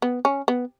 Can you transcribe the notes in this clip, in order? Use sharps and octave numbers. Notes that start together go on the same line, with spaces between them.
B3
C#4
B3